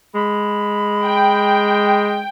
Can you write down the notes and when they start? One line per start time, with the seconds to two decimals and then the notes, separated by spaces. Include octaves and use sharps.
0.15 G#3 B5
1.04 G5